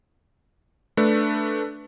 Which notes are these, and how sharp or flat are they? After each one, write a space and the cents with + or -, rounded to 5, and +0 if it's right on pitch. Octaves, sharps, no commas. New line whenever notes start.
A3 +0 D4 +0 B4 +0